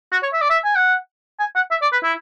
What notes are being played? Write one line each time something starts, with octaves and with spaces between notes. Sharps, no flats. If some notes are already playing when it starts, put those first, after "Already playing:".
F#4
C#5
E5
D5
E5
G#5
F#5
G#5
F#5
E5
D5
B4
E4